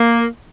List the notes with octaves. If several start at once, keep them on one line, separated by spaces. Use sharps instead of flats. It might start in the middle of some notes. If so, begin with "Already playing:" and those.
Already playing: A#3